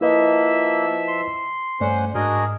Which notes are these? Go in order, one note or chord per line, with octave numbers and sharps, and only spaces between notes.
F3 A#3 E4 B4 D#5 E5 E6
C6
G2 A3 C#4 C5 D5 F#5
G#2 D4 F#4 G#4 A#4 D#5